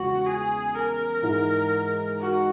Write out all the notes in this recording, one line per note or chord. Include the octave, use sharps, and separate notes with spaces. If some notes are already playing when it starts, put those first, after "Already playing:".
Already playing: E2 C#3 G#3 F#4
G#4
A#4
G#2 E3 G#3 D#4
F#4